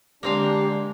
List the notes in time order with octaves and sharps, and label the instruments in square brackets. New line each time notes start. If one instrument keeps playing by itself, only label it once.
[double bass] D3 G#3 [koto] A#3 C4 F5 [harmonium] D4 [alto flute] G4